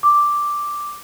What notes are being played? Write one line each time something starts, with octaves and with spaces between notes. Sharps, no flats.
D6